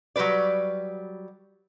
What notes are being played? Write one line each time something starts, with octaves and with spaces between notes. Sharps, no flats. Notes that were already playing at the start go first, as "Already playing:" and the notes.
F#3 G3 A4 B4 D5